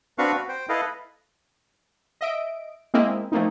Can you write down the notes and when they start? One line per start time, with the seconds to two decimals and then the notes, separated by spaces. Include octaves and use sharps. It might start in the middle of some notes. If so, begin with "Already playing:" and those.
0.18 C4 D4 F#4 B4 F5 C#6
0.34 F#4
0.48 C5 G5
0.69 E4 A4 B4 D#5 F5
2.21 D#5 E5 D7
2.94 G#3 A#3 C4 E4 A#4 D#5
3.32 F3 A3 A#3 C4 D#4